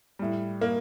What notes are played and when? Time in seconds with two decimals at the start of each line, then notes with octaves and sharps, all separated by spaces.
0.19 A2 G3
0.61 A#3